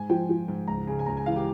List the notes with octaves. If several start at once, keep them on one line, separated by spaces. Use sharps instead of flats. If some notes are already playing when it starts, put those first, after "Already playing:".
Already playing: G#2 G#5
F3 G5
F3
G#2
C#2 A#5
C#3 G#5
G#5
C#2 A#5
G#5
E3 F5
G4